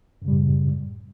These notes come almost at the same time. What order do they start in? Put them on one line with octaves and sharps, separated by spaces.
F#2 C#3 G3 A2